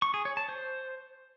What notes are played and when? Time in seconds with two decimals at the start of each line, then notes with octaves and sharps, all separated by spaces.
0.02 C#6
0.14 G#4
0.25 C#5
0.37 A5
0.49 C5